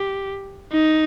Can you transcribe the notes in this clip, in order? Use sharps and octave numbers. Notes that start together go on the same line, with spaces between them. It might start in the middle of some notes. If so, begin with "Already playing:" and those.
Already playing: G4
D#4